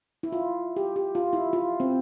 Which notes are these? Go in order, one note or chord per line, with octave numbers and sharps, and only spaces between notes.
E4
F4
G4
G4
F4
E4
F4
C4